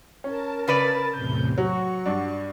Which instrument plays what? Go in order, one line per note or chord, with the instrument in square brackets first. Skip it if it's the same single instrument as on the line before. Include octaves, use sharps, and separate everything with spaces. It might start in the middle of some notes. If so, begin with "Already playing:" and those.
[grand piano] C#4 [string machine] A#4 A5
[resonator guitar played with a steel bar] C#3 B4 D5 [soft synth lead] A6
[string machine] E2 A2 C3 [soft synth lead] G6
[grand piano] F#3 [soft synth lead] F#4 [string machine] C#6
[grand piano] G2 D4